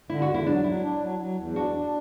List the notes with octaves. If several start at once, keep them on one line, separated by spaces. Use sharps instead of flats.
D3 E4
F#4
E2
E4
F#3 D4
F#3 E4
D4
F#3
F#3
E2
D4 F#4
D4